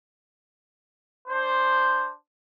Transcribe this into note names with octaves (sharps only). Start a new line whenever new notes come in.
D4 C5